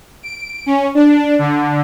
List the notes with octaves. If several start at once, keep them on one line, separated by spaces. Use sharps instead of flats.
D7
C#4
D4
D3